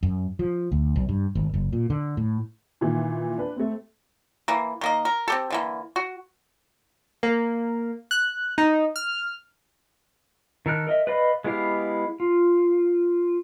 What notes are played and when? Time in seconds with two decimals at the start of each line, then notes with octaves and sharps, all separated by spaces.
0.03 F#2
0.39 F3
0.72 D2
0.96 B1
1.09 G2
1.35 G#1
1.54 F#1
1.73 A#2
1.90 D3
2.17 A2
2.81 A#2 D#3 E3
3.38 D4 B4
3.56 A3 C4
4.48 E3 A#3
4.81 D#3 A#3 D#5
5.05 A#4
5.28 C4 G4 A4
5.50 D3 E3 A#3
5.96 F#4
7.23 A#3
8.11 F#6
8.58 D#4
8.96 F6
10.66 D#3 A4 A#4 F#6
10.87 A#4 D#5 E5
11.07 B4 D5 D#5 F5 B5
11.44 G#3 B3 E4 G4 F5
12.20 F4